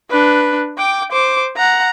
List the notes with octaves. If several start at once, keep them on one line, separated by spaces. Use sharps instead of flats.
D4 B4
G5 D6
C5 D6
F#5 A#5